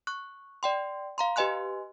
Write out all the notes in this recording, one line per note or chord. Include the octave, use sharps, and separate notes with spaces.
C#6 F#6
D5 G5 C6
F5 A#5 C6
G4 B4 D#5 G#5 C6 F#6